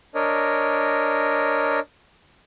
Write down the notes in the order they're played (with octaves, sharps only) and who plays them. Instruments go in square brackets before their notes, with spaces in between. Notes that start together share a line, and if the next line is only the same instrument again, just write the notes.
[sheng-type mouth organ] D4 A#4 C#5 D#5